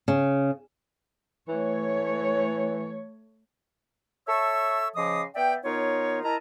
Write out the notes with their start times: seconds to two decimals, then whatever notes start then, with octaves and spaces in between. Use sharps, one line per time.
0.08 C#3
1.48 E3 A3 C#5
4.27 A4 C#5 E5 A5 C#6 E6
4.96 C#3 F3 D#5 C6 D6 D#6
5.35 B3 D5 E5 G5
5.64 D#3 B3 D#4 F4 C#5
6.23 E4 A#4 D#5 A5 A#5